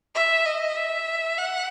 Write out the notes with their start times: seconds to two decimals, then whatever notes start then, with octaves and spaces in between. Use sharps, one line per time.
0.14 E5
0.45 D#5
0.75 E5
1.37 F#5